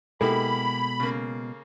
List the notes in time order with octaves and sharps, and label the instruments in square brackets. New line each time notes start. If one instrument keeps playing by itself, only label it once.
[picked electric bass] B2 G#3 [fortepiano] A#3 E4 G4 [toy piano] A4 [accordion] B5
[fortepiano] C#3 A#3